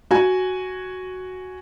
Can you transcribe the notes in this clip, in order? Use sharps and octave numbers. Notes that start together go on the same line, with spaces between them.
F#4 G#5